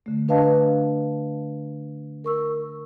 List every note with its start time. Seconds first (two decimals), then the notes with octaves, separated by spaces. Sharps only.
0.06 D3 A3
0.28 D4 B4 D#5 F5 A5
2.24 A#4 C#6 E6